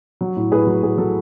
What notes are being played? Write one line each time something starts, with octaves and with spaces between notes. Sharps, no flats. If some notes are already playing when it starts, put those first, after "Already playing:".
F#3
A2
A2 G#4 B4
F#3
A2 G#4
F#3 A4